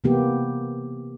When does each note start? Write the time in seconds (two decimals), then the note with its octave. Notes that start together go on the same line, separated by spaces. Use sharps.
0.04 C3 E3 A#3 B3 G4